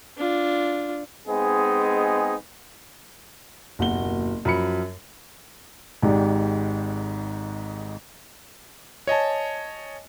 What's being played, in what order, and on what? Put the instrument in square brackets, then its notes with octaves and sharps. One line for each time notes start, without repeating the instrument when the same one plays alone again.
[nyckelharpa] D4 F4
[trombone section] G#3 B3 C4 D#4 G#4
[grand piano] F#1 D#2 B2 F#4 G7
F#2 F3 B5 C#7
[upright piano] G#1 G#2 G4 D5
[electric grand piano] C#5 D#5 G#5 A5